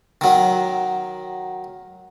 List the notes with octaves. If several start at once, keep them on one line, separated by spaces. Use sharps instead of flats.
D#3 F#3